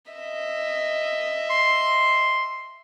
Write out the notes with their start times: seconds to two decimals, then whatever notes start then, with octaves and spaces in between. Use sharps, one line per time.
0.12 D#5 E5
1.50 C6